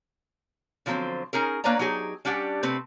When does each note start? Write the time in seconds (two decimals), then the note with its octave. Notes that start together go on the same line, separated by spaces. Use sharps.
0.86 D3 F3 F#3 A#3 C4 C5
1.33 C#4 D#4 G#4 A#4
1.64 A#3 D4 B4 C#5 D5 A#5
1.79 F#3 D#4 G4 G#4
2.25 G3 C#4 D4 G4 F#5
2.63 C3 A3 C4 B4